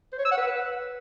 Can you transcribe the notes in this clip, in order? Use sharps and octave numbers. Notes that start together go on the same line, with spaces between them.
C5
C#5
E6
F#5
B4